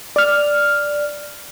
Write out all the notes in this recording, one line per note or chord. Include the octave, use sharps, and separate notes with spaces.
D5 F6